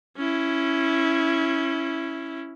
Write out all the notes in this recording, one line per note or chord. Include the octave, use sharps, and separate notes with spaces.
C#4 E4